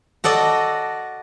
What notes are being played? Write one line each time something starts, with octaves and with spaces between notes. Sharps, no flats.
F#4 A4 D5 D#5